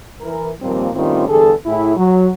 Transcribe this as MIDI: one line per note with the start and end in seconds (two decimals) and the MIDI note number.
0.21 0.49 52
0.21 0.49 70
0.61 0.89 39
0.61 0.89 46
0.61 0.89 53
0.61 0.89 55
0.61 0.89 58
0.61 0.89 60
0.94 1.26 45
0.94 1.26 51
0.94 1.26 55
0.94 1.26 60
0.94 1.26 61
0.94 1.26 65
1.28 1.52 40
1.28 1.52 50
1.28 1.52 55
1.28 1.52 68
1.28 1.52 69
1.66 1.95 45
1.66 1.95 64
1.66 1.95 68
1.96 2.29 54